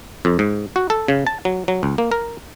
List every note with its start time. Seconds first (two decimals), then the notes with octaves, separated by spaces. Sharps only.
0.25 F2
0.39 G#2
0.76 F#4
0.90 A4
1.08 C#3
1.27 A5
1.45 F#3
1.68 F#3
1.83 C#2
1.98 A#3
2.12 A#4